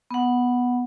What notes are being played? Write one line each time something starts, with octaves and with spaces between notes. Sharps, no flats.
B3 F#5